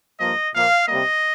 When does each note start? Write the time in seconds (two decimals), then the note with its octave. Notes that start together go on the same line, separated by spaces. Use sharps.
0.19 G2 F3 A#3 D#5
0.53 A#2 F3 A#3 F5
0.87 C3 G3 A#3 D#5